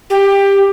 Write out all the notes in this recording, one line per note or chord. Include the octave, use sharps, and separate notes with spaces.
G4